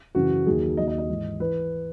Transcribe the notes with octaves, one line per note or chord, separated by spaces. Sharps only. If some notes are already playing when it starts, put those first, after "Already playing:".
F#2 C#3 E3 F#4
D#2 D#3 F#3 G#4
D#2 D#3 F#3 D#5
D#5
D#5
G#2 E3
E3 B4